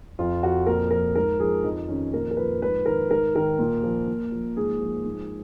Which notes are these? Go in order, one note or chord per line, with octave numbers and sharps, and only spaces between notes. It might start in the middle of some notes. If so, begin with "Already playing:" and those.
F2 F4
F2 F#4
A#2 A#4
F3 A#4
G#2 A#4
F3 G#4
F2 D#4
D#3 C#4
A#2 A#4
A#4
F3 B4
G#2 B4
D#3 A#4
G#2 A#4
D#3 A#4
A#2
F3
A#2
F3
G#2 G#4
F3
G#2